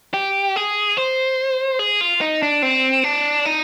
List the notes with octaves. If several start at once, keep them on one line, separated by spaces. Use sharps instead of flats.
G4
G#4
C5
G#4
F4
D#4
D4
C4
D4
D#4